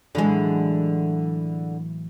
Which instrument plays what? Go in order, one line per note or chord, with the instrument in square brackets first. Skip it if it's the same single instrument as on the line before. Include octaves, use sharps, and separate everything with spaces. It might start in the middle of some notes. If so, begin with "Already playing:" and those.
[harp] A2 E3 F#3 [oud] D3 G#3